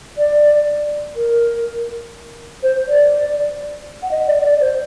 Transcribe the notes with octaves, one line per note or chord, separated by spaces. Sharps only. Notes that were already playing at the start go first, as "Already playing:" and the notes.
D5
A#4
C5
D5
F#5
D#5
D5
D5
C5